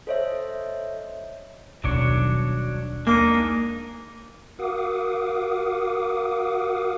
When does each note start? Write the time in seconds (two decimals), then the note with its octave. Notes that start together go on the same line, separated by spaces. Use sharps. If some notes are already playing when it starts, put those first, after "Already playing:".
0.07 A4 C5 C#5 D#5 E5
1.84 D#1 B1 F#3 D4 C#5
3.07 G#3 A#3 D4 D#4
4.59 F#4 A#4 F5 F#5 D6 D#6